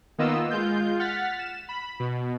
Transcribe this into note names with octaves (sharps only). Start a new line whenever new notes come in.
D#3 A#3 B3 F4 D#5 E6
G#3 F4 G6
F#5 F6 A6 B6
E7
B5
B2